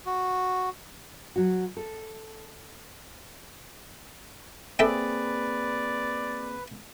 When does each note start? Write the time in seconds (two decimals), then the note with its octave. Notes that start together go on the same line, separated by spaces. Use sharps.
0.06 F#4
1.36 F#3 F#4
1.77 A4
4.79 A#3 C4 G#4 A4 B4 D5 E5 G5